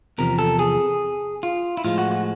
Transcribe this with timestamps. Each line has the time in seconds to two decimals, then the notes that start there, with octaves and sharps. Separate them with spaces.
0.18 E2 C3 F3 A#4
0.39 A4
0.59 G#4
1.43 F4
1.77 E4
1.84 A2 F3 G#3 F4
1.98 F#4
2.12 F#4